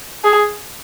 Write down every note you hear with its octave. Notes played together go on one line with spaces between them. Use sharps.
G#4